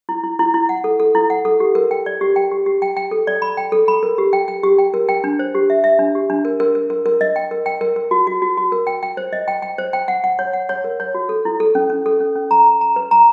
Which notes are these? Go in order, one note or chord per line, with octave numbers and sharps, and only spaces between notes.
E4
E4
E4
E4
F#5
A4
A4
E4
F#5
A4
G4
A#4
G5
D5
G4
G5
G4
G4
G5
G5
A4
D5
B5
G5
A4
B5
A#4
G4
G5
G5
G4
G5
A#4
G5
D4
C5
G4
E5
E5
D4
G4
D4
A#4
A#4
A#4
A#4
A#4
D#5
G5
A#4
G5
A#4
A#4
F#4
F#4
F#4
F#4
A#4
G5
G5
C5
D#5
G5
G5
C5
G5
F#5
F#5
C#5
F#5
C#5
A#4
C#5
F#4
A4
E4
A4
C#4
C#4
A4
C#4
C#4
A#5
A#5
A#5
B4
A#5